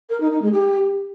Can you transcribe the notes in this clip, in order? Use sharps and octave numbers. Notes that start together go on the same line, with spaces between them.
A#4
D#4
D#4
G#3
G4